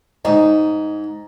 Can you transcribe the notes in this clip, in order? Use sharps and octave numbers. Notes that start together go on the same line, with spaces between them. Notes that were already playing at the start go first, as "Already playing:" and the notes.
G#2 D#4